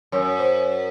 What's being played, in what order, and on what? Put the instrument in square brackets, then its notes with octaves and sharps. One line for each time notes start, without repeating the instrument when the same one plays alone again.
[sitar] F#2 [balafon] C#5
[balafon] C5